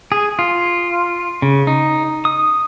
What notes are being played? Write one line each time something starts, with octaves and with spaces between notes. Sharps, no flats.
G#4
F4
C#3
D#4
D#6